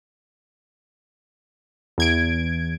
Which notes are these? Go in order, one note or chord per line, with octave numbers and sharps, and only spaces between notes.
E2 G#6 D7